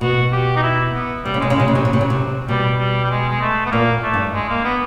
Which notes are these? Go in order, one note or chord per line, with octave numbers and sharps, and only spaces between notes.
B2 F#4
G4
D#4
E4
B3
C3 G3
C#3
C3 G#3
C#3
C3 G#3
C#3
C3 F#3
C#3
C3
C#3
C3
B2 G3
G3
G3
G#3
G#3
A3
B3
A#2 A#3
A3
G2
G#3
A#3
B3